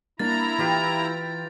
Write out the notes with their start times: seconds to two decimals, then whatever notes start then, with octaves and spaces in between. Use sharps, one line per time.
0.19 A#3 D4 E4 A#5 A6
0.58 E3 F4 G4 G5